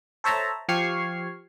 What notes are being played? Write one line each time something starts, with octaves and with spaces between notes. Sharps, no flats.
A4 C5 C#5 E5 A5 A#5
F3 G4 C#6 F6 G#6 C7